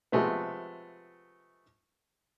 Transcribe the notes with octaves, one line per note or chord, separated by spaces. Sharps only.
C3 F3 G#3 A3 B3